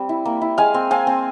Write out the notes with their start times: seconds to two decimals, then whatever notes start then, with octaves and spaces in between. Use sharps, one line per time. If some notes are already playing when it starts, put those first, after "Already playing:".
Already playing: G3 C4
0.09 E4
0.25 A#3
0.41 E4
0.58 G#3 F5 G#5
0.74 C4
0.91 C4 F5 G#5
1.07 C4